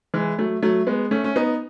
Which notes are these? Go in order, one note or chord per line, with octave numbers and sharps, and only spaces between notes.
E3 G#3
F#3 A3
F#3 A3
G#3 B3
A3 C#4
C#4
B3 D#4